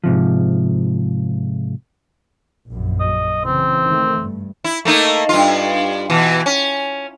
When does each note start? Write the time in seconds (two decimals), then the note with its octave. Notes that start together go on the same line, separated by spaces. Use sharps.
0.04 G#2 C3 F3
2.67 A#1 F#2
3.00 D#5
3.44 C#3 E3 C4
3.84 D#3 A3
4.20 G2
4.64 E4
4.85 A3 A#3 D#4
5.29 G2 F4
6.10 B2 E3
6.46 C#4